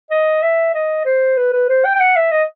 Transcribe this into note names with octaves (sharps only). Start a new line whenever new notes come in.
D#5
E5
D#5
C5
B4
B4
C5
G5
G5
F#5
E5
D#5